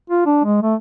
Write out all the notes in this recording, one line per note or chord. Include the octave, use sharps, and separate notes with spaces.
F4
D4
G#3
A3